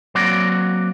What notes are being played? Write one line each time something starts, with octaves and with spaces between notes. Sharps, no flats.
F#3 A#3 C4 F#4 D5